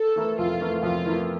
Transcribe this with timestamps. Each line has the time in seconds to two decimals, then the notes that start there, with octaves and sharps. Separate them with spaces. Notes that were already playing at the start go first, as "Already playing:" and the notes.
Already playing: A4
0.16 E3 A3 E4 A#4
0.38 F2 F4
0.61 E3 A3 E4 A#4
0.83 F2 F4
1.06 E3 A3 E4 A#4